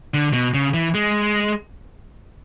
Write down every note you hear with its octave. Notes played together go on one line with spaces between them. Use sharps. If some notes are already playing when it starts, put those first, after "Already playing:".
D3
B2
C#3
E3
G#3